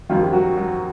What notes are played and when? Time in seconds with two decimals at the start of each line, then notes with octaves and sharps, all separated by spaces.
0.09 G#1 F#2 D#3 F3 F4
0.22 G4
0.33 F#3 F#4
0.57 F#3 F#4